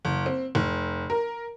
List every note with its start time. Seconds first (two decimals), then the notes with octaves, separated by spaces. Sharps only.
0.05 F#1
0.26 C4
0.55 F1
1.10 A#4